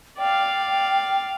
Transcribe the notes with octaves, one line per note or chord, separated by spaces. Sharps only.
D5 F5 G5